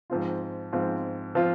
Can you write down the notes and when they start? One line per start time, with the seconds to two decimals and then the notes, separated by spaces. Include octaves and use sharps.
0.10 G#2 F3 C4 F4
0.72 G#2 F3 C4 F4
1.35 F3 C4 F4